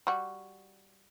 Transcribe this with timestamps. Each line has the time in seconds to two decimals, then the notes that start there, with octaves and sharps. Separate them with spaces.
0.07 G3 F#4